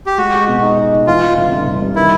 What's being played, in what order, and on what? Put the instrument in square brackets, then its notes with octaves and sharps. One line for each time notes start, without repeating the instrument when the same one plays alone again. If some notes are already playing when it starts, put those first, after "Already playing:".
[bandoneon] G4
[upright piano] G#3 [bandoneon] F#4
[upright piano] G#3
B2
D#4
D#4
D#4
[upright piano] E3 [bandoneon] F4
[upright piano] E3
G1
G1
G1
G2
[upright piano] D#3 [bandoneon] E4